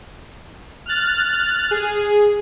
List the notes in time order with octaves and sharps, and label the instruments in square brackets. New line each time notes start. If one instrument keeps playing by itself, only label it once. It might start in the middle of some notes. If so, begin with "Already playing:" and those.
[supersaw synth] F6 F#6 A6
G#4